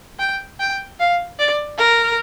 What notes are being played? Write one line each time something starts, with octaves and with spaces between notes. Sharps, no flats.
G5
G5
F5
D5
A#4